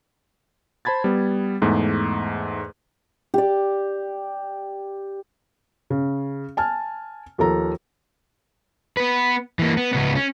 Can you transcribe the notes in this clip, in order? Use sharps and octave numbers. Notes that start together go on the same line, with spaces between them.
C5 A5 B5 G#6 A6
G3 B3
E2 G#2 A3
G4 D5
C#3
G#5 A5 F6
D#2 F3 A4 A#5
B3 B4
E3 A#3
B3
C#2 B3
C#4